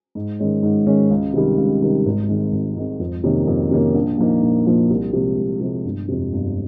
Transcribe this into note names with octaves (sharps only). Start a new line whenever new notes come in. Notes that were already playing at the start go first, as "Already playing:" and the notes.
G#2
D#3 G#3 C#4
G#2
D#3 G#3 C#4
C#2
C3 D#3 G3
C#2
C3 D#3 G3
G#1
G#2 D#3 G#3 C4
G#1
G#2 D#3 G#3 C4
F2
C3 D#3 A#3 C#4
F2
C3 D#3 A#3 C#4
A#1
A#2 F3 A#3 D#4
A#1
A#2 F3 A#3 D#4
C2
C3 F3 G#3
C2
C3 F3 G#3
G1
F2 C3
G1